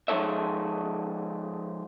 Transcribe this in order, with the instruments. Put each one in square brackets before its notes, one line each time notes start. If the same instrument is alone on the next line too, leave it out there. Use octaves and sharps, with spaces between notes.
[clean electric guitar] F3 G#3 D#4 A4 C#5 E5